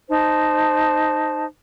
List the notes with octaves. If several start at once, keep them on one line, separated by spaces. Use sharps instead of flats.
D#4 C5 A5